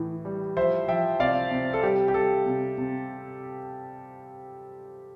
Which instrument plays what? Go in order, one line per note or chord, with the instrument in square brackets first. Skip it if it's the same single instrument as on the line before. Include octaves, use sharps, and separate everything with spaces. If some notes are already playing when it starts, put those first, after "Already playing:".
Already playing: [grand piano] A2 E3
G3
F3 C5 E5
F3 E5 G5
C3 D5 F5
C3
A4
G3 G4
G4
G3 A4
C3
C3